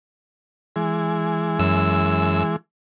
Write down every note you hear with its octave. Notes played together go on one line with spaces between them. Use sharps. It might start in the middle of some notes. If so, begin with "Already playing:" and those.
E3 G#3
F#2 E6